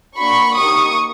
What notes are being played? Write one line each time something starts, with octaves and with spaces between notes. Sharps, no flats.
A#3 D4 F#4 B5 C#6
A#3 D#4 G4 C#6 D#6